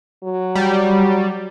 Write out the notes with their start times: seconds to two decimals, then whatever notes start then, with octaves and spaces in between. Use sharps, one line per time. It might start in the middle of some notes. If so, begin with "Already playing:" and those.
0.23 F#3
0.55 G3